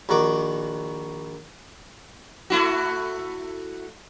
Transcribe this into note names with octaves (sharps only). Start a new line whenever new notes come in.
A#1 D#3 F#4 D6
A3 E4 F#4